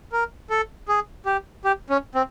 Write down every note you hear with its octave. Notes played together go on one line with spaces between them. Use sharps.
A#4
A4
G#4
G4
G4
C#4
C4